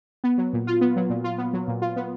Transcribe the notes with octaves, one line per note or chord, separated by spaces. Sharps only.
B3
F#3
A#2
F4
B3
F#3
A#2
F4
B3
F#3
A#2
F4
B3